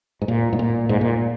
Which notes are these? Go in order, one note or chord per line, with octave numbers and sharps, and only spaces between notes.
G#2
A#2
G#2
A#2
G#2
A#2